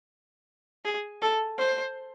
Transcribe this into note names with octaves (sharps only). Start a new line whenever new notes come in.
G#4
A4
C5